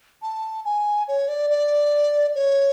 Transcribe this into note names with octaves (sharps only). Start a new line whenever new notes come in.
A5
G#5
C#5
D5
D5
C#5